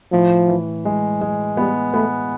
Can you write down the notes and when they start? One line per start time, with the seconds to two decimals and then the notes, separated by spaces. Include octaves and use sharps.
0.12 A2 F3
0.48 E3
0.85 G#3
1.21 G#3
1.57 G3 B3
1.94 A3 B3